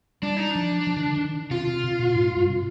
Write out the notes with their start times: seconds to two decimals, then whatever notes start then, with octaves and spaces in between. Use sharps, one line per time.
0.22 G3 D4
0.37 D#4
0.51 F3 D4
0.87 F3
0.97 D#3
1.06 D3
1.17 D#3
1.51 C3 F4
1.67 C3
1.84 C3
1.99 A#2
2.15 G#2
2.36 G2
2.49 C3